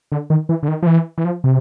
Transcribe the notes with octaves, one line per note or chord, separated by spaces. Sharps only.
D3
D#3
E3
D3
D#3
F3
E3
E3
F3
C3